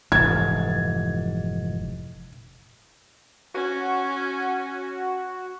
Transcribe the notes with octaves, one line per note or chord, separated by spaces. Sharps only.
F1 G#2 E3 G#6 A6
C#4 F#4